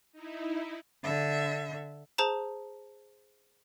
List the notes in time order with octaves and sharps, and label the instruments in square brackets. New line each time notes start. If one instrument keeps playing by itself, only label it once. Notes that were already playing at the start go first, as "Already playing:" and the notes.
[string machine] D#4 E4
[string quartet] D3 E5
[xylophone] G#4 C5 A5 A#5